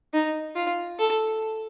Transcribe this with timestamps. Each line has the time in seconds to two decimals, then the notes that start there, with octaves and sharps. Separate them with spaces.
0.13 D#4
0.55 F4
0.99 A4